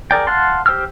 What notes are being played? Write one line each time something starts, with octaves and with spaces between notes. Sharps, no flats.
G#4 A#4 D5 G5
F5 F#5 A5 C6
G4 C5 G5 E6 F6